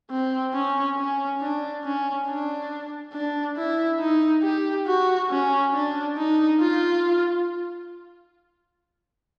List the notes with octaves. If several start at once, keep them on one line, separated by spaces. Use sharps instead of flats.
C4
C#4
C#4
D4
C#4
D4
D4
E4
D#4
G4
F#4
C#4
D4
D#4
F4